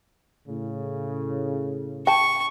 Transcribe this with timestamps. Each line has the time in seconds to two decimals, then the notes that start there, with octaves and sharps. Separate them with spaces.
0.48 A2 C#3
2.07 G5 A5 C#6